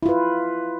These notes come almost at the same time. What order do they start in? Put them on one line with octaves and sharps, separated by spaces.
E4 F4 B4